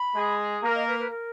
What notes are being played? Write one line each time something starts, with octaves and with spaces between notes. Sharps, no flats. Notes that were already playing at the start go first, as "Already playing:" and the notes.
Already playing: B5
G#3 G#4
A#3 A#4 A#5
D#5
B4
B4
A#4